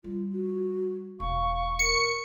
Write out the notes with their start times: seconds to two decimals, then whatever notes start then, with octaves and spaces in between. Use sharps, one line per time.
0.04 G3 F4
0.32 F#4
1.20 E1 F5 C#6
1.79 A#4 C#7